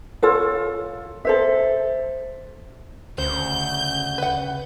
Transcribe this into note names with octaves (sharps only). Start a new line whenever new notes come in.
F4 A4 C#5
A4 C5 E5
D2 C#3 C5 G6
B4 F#5